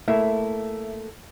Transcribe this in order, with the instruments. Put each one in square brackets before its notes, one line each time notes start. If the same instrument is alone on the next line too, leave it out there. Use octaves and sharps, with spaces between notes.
[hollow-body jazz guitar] A3 A#3 E4 [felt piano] E5